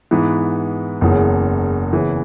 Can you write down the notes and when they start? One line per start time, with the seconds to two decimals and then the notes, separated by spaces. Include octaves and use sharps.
0.11 G#2 E3 B3
1.01 F#1 E2 C#3
1.93 E2 C#3 E3